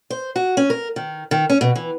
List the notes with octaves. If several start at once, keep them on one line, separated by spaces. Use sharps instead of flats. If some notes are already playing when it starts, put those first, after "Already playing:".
C5
F#4
C#4
A#4
D#3
D#3
C#4
B2
E3